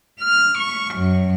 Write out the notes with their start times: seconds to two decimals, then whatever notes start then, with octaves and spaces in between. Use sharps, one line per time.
0.20 F6
0.59 C#6
0.95 F#2